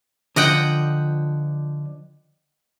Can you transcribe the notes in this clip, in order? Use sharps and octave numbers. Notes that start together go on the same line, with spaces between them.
D3 F3 D#5 F#5 G5